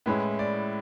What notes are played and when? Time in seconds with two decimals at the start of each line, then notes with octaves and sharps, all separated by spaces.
0.06 A2 G#3 C#4 E4 B4
0.39 D5